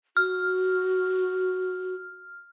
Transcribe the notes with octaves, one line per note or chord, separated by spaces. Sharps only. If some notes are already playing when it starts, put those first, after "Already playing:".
F#4 F6